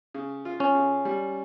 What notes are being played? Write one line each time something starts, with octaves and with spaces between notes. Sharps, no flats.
C#3
F4
C#4
C#3
G3